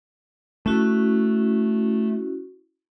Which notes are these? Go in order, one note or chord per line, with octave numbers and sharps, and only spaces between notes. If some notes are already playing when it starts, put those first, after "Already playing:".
A3 C#4 E4 F#4